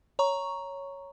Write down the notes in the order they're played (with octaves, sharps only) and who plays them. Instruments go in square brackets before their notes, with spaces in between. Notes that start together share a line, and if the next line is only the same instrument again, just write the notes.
[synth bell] C#5 A#5 C#6